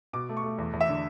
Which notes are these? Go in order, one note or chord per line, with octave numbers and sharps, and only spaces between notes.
B2 D6
A3
C#6
A3
E2
E2
E5
D3